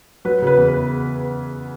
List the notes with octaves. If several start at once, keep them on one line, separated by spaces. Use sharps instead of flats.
F#3 B4
C#3 B4
E2
B4